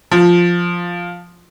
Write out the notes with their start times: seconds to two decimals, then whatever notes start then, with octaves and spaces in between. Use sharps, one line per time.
0.11 F3